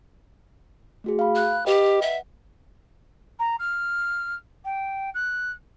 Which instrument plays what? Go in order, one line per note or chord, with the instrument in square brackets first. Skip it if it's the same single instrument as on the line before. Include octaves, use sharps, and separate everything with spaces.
[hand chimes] A3 F#4 G#4
F5 B5
[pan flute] F#6
[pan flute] G4 [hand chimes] B4 D#5 G5
[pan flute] E5 [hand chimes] F#5
[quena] A#5
F6
G5
F#6